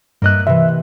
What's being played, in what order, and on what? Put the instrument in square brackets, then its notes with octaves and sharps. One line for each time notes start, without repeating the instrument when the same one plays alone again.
[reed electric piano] G2 F#6 [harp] A#3 D#5 E5
[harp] C3 E3 [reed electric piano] E5